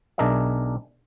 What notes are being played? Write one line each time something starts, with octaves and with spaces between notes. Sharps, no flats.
B1 D4 G#4 A#4 D#5 E5